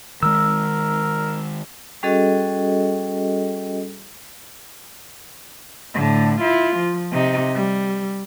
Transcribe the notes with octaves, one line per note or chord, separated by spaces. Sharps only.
D#3 G#3 A#4 E6
G3 C#4 F#4 G#4 A4 D#5
A2 D3
E4 F4
F3
C3 D#4
G3